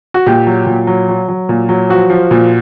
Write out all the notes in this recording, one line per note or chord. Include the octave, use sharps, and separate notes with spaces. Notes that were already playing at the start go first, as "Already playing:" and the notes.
F#4
A#2 G4
F#3
A#2
F#3
F#3
F#3
A#2
F#3
F3 F#4
F3
A#2